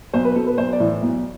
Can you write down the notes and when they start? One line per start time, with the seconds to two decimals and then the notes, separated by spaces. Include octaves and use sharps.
0.13 B1 C5
0.25 B4
0.35 B2 A4
0.47 B4
0.58 B1 C5
0.73 D5
0.80 A2 E3
1.02 B1